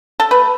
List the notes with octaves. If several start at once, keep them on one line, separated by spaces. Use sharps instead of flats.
A4
A3 B4